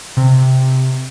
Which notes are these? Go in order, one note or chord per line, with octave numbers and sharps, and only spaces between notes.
C3